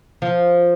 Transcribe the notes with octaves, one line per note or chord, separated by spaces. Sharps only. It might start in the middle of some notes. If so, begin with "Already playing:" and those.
F3